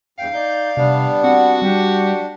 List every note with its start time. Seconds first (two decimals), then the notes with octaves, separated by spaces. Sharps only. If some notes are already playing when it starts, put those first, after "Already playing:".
0.19 E2 G2 F5 G5
0.33 D#4 D5 G6
0.77 C3 G3 B3 D4
1.24 C4 F#4 F#5
1.62 G3 D4 G4